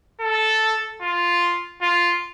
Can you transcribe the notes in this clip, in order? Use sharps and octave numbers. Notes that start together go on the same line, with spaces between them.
A4
F4
F4